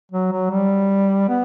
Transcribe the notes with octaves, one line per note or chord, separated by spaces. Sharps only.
F#3
F#3
G3
B3